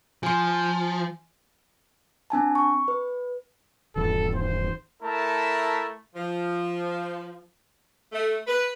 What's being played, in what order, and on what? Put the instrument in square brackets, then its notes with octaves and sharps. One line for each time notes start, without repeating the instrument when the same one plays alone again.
[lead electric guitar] F3 [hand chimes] G#5 C6
[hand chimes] C4 D4 G#5 A5
C#6
B4
[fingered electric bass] D#1 G2 E3 [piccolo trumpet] A4
[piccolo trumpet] C5
[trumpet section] A3 E4 A#4 E5 A5
[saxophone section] F3
A3
B4